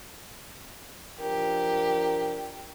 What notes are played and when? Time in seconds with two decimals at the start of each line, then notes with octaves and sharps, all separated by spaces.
1.20 F3 D4 G4 A#4